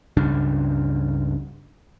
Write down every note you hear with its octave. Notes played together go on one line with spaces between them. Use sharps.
C#2 G2 C#3 D4